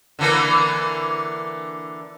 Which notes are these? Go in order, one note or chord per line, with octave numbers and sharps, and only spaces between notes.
D3 E3 A#3